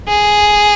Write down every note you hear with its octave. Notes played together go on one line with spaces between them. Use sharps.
G#4